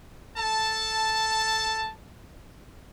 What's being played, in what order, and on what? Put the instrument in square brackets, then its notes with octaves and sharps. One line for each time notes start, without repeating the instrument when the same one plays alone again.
[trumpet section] A4 A5